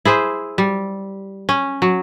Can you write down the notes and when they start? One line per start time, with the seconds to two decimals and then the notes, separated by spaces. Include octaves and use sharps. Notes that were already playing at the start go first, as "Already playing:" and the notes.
0.05 E4 G#4 C5
0.58 G3
1.49 C#4
1.82 F#3